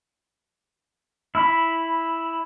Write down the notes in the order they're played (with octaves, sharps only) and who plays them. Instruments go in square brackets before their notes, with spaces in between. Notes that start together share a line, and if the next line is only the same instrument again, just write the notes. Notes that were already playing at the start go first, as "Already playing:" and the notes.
[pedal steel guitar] E4 B5